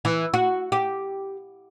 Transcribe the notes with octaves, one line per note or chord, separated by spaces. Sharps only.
E3
F#4
G4